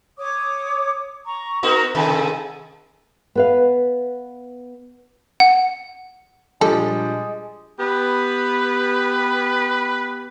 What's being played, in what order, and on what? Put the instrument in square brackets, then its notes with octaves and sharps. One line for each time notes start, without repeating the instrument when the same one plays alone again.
[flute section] C#5 D6 D#6
A#5 C#6
[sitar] B3 D#4 F#4 [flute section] A#4 A#5
[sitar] G#2 C3 D#3 [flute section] A4 G#5 A5
[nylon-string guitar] B3 B4 F5
[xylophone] F#5
[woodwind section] A#2 D4 [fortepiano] F3 G3 [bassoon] G#3 [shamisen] A4
[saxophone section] B3 G4 [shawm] B4